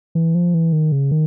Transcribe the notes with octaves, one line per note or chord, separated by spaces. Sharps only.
E3
F3
E3
D#3
C#3
D#3